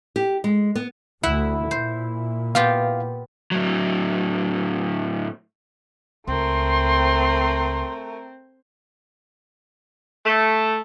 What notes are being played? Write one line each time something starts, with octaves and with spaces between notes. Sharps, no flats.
G4
G#3
B3
D2 E4 F#5
A#2 C5
B3 F4 G4 F5
A2 F#3
C#2 A3 C4 A#4 C6
A3